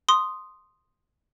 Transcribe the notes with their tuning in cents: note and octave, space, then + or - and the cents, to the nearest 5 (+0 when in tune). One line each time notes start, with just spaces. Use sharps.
C6 +0 D#6 -5